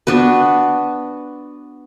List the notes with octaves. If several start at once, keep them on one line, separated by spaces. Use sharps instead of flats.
B3 D4 F#4 B4